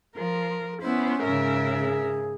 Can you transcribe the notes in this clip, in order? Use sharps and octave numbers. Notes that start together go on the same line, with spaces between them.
F3 A#4
B3 C#4 E4 C5
G#2 C#3 A#4 E5
G#4